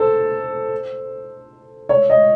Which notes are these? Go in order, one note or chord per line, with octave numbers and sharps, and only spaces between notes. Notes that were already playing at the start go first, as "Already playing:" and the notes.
Already playing: A4 C5
C#5
D#5